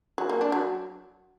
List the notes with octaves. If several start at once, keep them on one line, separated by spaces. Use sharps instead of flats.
F#3
A#3
D4
F#3